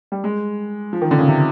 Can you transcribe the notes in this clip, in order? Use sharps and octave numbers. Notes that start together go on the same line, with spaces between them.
G3
G#3
F3
D#3
D3
C#3
C3